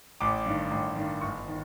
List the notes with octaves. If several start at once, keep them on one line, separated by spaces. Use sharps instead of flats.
A1 D6
G2 D#3
A1
G2 D#3
G1 C#6
D#3